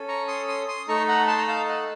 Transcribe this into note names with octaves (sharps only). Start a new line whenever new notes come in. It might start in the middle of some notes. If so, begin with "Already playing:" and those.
Already playing: C#4 A4
A#5 C#6
C6 D#6
C6 D#6
C6 D#6
A3 D#4 A4 A#5 C#6
F#5 A#5
A5 C6
A#5
F5 A5
D#5 F#5